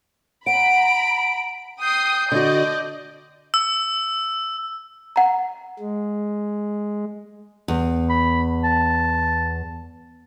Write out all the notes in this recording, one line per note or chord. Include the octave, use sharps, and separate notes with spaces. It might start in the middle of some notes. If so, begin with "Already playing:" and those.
F#5 A#5 B5 D7
G5 D#6 G6 C7
D3 F#4 D5 D#5
E6
F#5 A#5
G#3
E2
B5
A5